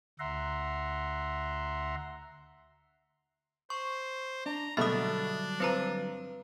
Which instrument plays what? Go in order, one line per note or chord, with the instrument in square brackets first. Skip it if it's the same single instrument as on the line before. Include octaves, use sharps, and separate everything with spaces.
[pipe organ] D2 E5 F#5 A#5 C6
[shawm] C5 [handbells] C#6
[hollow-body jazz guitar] D4 [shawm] A#5
[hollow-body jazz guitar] G2 D3 F#3 [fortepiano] B2 A3 [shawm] D4 [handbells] E5 D#6
[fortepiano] F3 [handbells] C4 B4 A#5